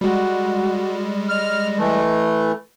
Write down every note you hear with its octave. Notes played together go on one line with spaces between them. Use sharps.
G3 G#3 F#4
D#5 F6
E3 A3